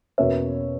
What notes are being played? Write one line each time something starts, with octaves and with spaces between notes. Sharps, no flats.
E2 B2 A#3 C#4 C#5 E5